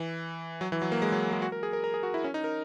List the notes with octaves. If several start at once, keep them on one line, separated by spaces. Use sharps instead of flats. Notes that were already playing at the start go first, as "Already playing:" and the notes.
Already playing: E3
F#3
E3
F#3
A#3
G#3
F#3
G#3
F#4
A#4
G#4
A#4
A#4
G#4
F#4
E4
C#4
D#4
A#4